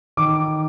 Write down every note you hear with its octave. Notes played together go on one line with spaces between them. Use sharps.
D#3 D6